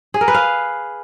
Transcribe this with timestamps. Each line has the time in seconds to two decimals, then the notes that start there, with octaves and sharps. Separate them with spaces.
0.14 G#4
0.21 A#4
0.28 B4
0.34 F5